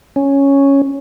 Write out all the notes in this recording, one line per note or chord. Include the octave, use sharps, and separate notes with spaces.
C#4